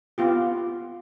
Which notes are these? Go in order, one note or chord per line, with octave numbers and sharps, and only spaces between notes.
B3 F4 G4